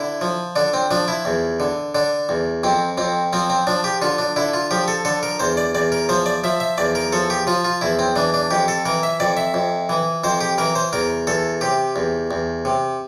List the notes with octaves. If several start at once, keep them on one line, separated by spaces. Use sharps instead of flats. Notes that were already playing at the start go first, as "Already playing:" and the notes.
Already playing: D3 E4
F3
D3 D4
C4
F3 D4
E4
E2
D3
D3 D4
E2
F2 C4
F2 C4
F3 C4
C4
F3 D4
G4
D3 F4
D4
D3 E4
F4
F3 G4
A4
D3 A4
A#4
E2 C5
D5
E2 D5
A#4
F3 C5
D5
F3 E5
E5
E2 D5
A#4
F3 A4
G4
F3 F4
F4
E2 E4
C4
E3 D4
D4
F2 G4
A4
E3 A#4
E5
F2 D5
E5
F2
E3
F2 C5
G4
E3 A#4
C5
E2 A#4
E2 A4
C3 G4
E2
E2
C3